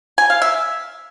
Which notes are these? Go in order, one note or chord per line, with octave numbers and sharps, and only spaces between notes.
G#5
F5
E5